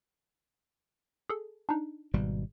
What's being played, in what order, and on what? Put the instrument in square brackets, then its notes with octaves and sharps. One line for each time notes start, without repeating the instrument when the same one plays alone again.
[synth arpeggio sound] G#4 A4
D4 D#4
[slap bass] G#1 B2 G3